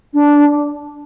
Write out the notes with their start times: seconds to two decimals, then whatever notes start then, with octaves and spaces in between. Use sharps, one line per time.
0.14 D4